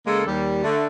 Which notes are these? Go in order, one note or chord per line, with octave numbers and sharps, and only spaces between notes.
C#3 G#3 A#3 A4
D#2 G3
D3 A3